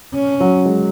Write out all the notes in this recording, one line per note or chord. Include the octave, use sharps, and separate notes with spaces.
C#4
F#3
G#3